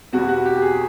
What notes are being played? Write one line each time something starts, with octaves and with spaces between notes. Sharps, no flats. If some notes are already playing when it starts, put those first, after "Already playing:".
E2 B2 G3 B3 F#4
F#4
G4
G#4